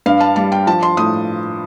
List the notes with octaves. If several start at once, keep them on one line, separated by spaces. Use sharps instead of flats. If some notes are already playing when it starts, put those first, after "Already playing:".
G2 F5
A5
G3 A5
G5
F3 A5
C6
A2 D#6